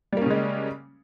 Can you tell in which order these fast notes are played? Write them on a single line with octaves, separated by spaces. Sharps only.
G3 A#3 C#4 C#3 G#3